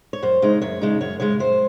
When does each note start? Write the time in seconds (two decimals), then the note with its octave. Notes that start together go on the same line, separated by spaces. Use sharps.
0.13 C#5
0.22 F#2 C5
0.42 C#3 G#3 D#4
0.62 F#2 C#5
0.81 C#3 G#3 D#4
1.01 F#2 C#5
1.20 C#3 G#3 C#5
1.40 F#2 C5